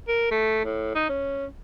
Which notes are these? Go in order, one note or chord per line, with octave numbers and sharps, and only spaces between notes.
A#4
A3
A2
D#4
C#4